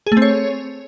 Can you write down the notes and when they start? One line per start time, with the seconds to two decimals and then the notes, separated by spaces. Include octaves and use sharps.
0.07 G#4
0.12 A3
0.17 C4
0.22 C#5